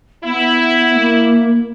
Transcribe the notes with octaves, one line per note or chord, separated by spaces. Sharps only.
B3 E4
A#3